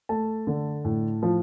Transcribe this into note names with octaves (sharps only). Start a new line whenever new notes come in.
A3 A5
D3
A2
F3